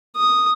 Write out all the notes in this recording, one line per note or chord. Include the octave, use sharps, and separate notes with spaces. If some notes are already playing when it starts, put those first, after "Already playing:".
D#6